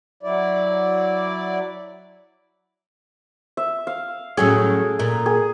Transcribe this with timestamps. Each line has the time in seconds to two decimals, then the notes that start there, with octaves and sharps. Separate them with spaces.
0.23 F#3 E4 D5
3.57 E5
3.87 F5
4.37 A2 F#3 C#4 G#4 A4
4.99 A#2
5.26 G#4